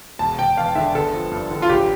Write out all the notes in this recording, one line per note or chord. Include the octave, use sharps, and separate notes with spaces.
E1 A5
E1 G5
E2 F5
D3 E5
G1 A4
F3
G2
D3
F4
A1 G4